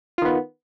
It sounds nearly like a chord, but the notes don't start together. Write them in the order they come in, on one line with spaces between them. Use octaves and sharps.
F4 D#3 B3